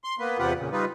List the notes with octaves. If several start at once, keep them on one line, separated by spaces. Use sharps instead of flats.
C6
A#3 B3 B4
E2 C3 F4 G4 B4 F#5
A#2 C#3
G3 D#4 F4 B4